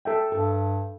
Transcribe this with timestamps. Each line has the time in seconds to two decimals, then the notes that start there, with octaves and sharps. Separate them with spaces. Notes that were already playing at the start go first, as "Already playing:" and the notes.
0.05 A4 E5 G5
0.32 G2 A4